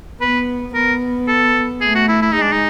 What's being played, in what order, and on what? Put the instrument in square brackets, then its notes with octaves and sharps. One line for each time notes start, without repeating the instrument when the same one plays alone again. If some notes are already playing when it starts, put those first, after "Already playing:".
[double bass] B3 [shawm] B4
[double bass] B3 [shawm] A#4
[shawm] A4
[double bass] A3 [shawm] G#4
[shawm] F#4
E4
E4
[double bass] G#3 [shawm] D#4
[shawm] D4
D#4